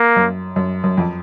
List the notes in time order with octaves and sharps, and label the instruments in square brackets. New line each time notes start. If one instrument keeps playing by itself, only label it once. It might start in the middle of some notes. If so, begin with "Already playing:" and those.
Already playing: [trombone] A#3
[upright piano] F#2
F#2
F#2
F2